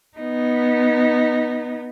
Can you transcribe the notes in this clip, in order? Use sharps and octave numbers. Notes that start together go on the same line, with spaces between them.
B3 D#4